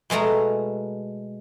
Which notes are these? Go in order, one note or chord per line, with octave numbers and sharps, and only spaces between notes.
B2 G#3 A3 A#5